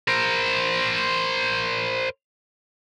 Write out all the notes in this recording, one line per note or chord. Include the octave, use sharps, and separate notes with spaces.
A#4 C5